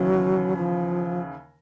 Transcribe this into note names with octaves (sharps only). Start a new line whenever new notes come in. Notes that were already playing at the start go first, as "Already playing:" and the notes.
Already playing: D#2 C#3 E3 F#3
F3